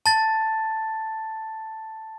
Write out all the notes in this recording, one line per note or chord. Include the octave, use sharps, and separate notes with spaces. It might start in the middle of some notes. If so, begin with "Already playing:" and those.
A5 A6